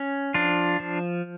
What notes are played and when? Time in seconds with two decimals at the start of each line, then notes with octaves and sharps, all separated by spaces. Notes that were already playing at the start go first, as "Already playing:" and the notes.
Already playing: C#4
0.34 F3 D4 F4
0.80 F3